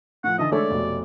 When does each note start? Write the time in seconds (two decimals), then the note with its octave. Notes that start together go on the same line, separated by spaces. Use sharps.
0.24 A2 F3 F#5
0.38 D3 E3 D#4 D#5 E5 A5
0.52 G#3 A3 D4 A4 C#5 D5 E5
0.70 F1 B2